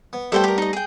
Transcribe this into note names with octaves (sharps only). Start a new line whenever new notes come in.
B3
G3 A3 B3 A4 C5 G5
G4 A#4
D#4 D#5
G#4 G5